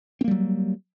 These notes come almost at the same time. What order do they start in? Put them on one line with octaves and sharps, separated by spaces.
C4 A#3 G3 F#3